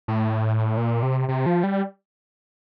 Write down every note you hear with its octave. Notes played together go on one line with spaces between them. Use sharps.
A2
A#2
C3
C3
F3
G3